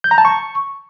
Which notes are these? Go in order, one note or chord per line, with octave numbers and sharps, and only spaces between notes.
G6
A#5
A5
C#6